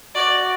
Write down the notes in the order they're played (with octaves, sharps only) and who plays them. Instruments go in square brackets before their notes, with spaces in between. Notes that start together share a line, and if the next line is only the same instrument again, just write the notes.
[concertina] F#4 [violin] D5